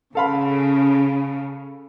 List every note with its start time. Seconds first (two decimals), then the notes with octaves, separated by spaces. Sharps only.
0.15 C#3 A4 F5 B5